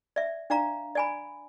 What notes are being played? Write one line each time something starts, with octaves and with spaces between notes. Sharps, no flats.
D5 E5
D4 D5 F5 A#5
D5 G#5 B5